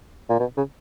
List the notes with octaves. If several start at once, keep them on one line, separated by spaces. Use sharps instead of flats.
A#2
B2
C#3